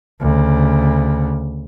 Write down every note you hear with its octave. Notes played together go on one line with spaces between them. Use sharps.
D2 C#3